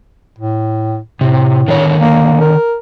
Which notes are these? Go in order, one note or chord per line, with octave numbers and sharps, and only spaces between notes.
A2
A2 C3
D3 D#3 C#5
A#3
A#4